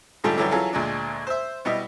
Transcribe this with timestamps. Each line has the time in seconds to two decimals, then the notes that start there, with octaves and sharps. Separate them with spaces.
0.24 G#2 D3 F3 G3 A3
0.37 F#2 D3 E3 F#3 G3
0.51 E3 F#3 F4 G#4 A4
0.73 D2 A#2 G#3 D4
1.27 C5 E5
1.65 B2 G3 E4 D#5